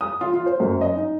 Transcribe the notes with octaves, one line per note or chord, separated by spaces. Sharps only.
D#6
F4
F4
C5
F#2
D#5
D#4